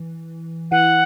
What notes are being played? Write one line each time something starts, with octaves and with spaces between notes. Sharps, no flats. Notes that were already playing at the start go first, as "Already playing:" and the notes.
Already playing: E3
E3 F#5